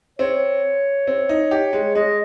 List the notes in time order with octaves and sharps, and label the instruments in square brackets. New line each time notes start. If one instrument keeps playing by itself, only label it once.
[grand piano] C4 [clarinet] C#5
[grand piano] C4
D#4
G4
G#3
[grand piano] G#3 [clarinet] D#5